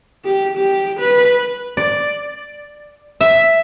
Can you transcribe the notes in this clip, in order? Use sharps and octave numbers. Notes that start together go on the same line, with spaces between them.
G4
G4
B4
D5
E5